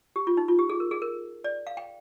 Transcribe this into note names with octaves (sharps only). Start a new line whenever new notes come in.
G4
F4
D#4
F4
G4
G#4
A#4
G#4
A#4
D5
F5
G5